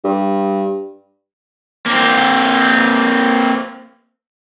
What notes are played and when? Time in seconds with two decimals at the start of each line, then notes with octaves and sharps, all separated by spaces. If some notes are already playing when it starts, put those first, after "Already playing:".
0.04 G2
1.86 A#3 C4